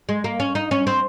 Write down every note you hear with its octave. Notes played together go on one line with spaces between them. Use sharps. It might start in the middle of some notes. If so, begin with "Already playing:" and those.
G#3
A#3
C#4
D#4
C#4
C4